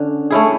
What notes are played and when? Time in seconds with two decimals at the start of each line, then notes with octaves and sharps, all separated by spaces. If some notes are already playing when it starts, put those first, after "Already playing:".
Already playing: D3 C#4
0.31 A3 C#4 E4 G#4